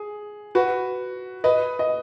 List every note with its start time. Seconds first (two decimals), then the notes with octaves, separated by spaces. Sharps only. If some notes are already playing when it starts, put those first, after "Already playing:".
Already playing: G#4
0.55 F#4 B4
1.44 B4 D#5
1.79 D#5